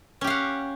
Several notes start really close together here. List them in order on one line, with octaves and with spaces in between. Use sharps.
C#4 G4 F5 F#5